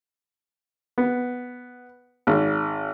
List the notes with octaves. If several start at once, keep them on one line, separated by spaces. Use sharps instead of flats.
B3
G#1